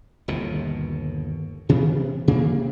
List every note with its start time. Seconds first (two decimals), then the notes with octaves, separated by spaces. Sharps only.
0.28 G1 D#2 B2
1.69 C3 E3 F3 B3
2.28 C3 A#3